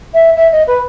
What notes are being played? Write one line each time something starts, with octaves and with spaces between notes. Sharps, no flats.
E5
E5
D#5
B4